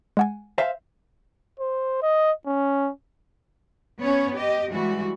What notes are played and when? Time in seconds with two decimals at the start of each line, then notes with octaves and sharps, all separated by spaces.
0.17 G#3 F#5 G#5
0.58 C5 E5 F5
1.60 C5
2.02 D#5
2.46 C#4
4.00 B3 C#4 C#5
4.35 G4 D#5
4.72 E3 G3 G#3 F#4